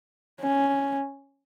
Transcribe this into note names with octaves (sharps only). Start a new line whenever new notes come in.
C#4